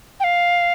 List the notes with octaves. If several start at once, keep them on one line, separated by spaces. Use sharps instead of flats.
G5
F5